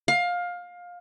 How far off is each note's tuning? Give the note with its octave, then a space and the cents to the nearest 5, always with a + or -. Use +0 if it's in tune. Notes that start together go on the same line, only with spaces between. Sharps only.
F5 +20